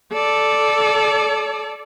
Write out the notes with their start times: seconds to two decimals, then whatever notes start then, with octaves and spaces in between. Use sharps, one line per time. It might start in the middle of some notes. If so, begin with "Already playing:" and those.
0.13 A4 D5